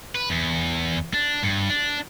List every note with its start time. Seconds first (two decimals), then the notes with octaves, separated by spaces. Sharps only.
0.15 B4
0.30 E2
1.14 D4
1.43 G2
1.70 D4